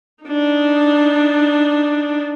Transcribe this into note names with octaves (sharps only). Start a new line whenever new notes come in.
D4 D#4